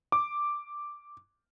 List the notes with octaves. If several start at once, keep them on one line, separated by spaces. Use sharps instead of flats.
D6